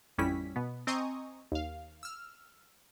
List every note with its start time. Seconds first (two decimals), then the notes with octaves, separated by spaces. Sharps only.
0.18 A1 F2 G3 C#4 E4 B6
0.56 B2 B3
0.87 C4 D#5 G#5 A#5 C#6 D#6
1.52 D#2 F5
2.03 E6 F6